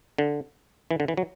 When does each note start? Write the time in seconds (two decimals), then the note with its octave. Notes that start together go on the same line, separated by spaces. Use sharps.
0.18 D3
0.91 E3
1.00 D3
1.08 E3
1.17 F#3